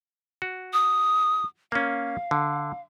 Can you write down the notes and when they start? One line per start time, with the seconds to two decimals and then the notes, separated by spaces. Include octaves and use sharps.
0.42 F#4
0.73 D#6
1.72 A#3 C#4 F5
2.31 D3